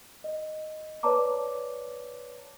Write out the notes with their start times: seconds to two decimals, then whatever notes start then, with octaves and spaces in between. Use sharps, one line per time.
0.24 D#5
1.03 B4 C#5 D5 A5 A#5 D6